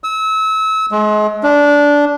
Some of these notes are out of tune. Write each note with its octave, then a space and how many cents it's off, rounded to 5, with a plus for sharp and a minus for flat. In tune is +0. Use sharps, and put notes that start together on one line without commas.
E6 -30
G#3 +35
D4 -15